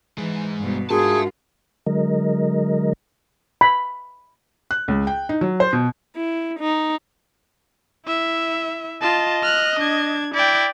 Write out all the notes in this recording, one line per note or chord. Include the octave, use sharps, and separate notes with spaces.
G#2 E3 G#3
G2 B2
G#2 D4 F4 F#4 G#4 A#4 E5 A5
D3 F#3 G#3 A#4 D#5
B5
F#6
C#2
G5
D#4
F#3
C5
B2
E4
D#4
E4 E5
F4 D#5 A5
F6 F#6
D4 G#6
E4 D5 G5